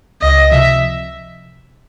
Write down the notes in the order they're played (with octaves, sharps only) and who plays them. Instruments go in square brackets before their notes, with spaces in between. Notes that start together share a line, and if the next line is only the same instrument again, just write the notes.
[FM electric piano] C#2 [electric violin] D#5
[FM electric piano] C3 F3 [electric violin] E5